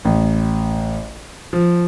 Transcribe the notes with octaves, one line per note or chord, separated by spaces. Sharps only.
A1
F3